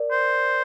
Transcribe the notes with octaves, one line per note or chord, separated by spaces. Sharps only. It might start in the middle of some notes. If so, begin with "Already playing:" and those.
Already playing: A#4 D5
C5